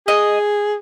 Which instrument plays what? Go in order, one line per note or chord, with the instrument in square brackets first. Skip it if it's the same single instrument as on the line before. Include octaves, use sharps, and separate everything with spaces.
[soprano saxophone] G#4 [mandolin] D#5